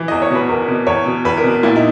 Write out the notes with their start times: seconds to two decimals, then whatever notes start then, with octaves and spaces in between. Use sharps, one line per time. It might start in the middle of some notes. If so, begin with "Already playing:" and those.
Already playing: E3
0.08 E2 D#5
0.22 C#5
0.30 B2 B4
0.49 E2 A#4
0.68 B2
0.87 E2 C#5
1.06 B2
1.25 E2 B4
1.37 A#4
1.44 B2
1.63 A#2 E4
1.76 D#4